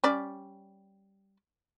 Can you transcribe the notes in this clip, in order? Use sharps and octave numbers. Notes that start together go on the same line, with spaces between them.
G3 C#4 D5